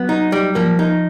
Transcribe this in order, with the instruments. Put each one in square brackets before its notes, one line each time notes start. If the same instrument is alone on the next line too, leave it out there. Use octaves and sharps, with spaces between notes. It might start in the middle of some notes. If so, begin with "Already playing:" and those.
Already playing: [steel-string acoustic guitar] F#3 [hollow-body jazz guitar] B3
[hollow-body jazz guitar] D#4
G3
[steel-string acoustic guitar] F3 [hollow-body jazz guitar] A#3
[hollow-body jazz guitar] D#4